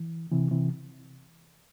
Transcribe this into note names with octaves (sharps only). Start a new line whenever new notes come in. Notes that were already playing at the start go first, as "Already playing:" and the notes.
Already playing: E3
C3 E3
C3 E3